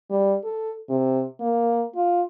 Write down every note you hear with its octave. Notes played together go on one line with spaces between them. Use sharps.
G3
A4
C3
A#3
F4